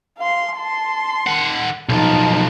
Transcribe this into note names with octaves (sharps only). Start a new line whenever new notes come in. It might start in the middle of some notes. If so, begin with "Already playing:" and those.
F5 C6
A5 C6
D#3 F#5
B1 F3 D#4 A5